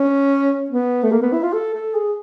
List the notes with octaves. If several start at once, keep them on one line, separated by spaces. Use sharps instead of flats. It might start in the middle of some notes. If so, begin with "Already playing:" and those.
Already playing: C#4
B3
A3
A#3
B3
E4
F4
A4
A4
G#4